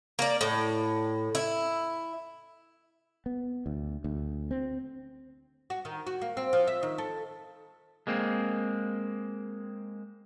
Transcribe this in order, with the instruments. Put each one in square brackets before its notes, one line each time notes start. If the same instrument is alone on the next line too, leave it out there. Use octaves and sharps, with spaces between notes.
[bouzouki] A#3 D5
A2
E4
[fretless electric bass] B3
D2
D2
C4
[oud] F#4
D#3
F#4
A#3
C4
F3
E5
D#3
A4
[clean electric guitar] G#3 A#3 C4